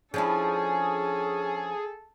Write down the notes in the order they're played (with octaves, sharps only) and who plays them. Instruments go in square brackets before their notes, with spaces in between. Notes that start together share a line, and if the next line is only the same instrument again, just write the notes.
[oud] F3 D4 E4 [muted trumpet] C#4 [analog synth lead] G#4 [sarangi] A4